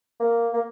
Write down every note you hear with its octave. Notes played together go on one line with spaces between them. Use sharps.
A#3
A#3